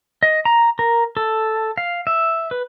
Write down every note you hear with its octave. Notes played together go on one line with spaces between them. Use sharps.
D#5
A#5
A#4
A4
F5
E5
B4